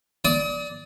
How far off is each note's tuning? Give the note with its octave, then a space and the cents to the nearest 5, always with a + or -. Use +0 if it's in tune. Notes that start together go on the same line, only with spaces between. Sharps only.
D5 -10 D#6 +35